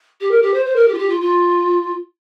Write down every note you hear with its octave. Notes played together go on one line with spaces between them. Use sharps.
G4
A#4
G4
C5
C5
A#4
G4
F4
G4
F4
F4